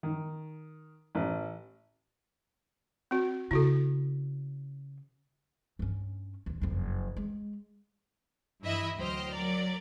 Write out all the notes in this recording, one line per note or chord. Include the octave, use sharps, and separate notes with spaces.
D#3
A1
C4 F#4
C#3 E4 F#4 A4
G2 C#4
D#2 A#2
F#1 F2
G#3
G2 E3 E4 D#5 E5 B5
D2 F#3 C5 D#5 G5 F6
F#3 A#4 D5